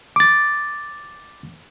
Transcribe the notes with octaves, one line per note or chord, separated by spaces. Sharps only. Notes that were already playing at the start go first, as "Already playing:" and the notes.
D6 A6